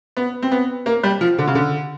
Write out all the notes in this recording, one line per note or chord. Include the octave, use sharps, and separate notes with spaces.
B3
C4
B3
A#3
G3
F3
D3
C#3
D3